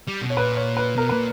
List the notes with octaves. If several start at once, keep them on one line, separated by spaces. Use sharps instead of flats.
G3
B2
C#5
A#2 B4
C#5
B4
B2 A#4
A#2 B4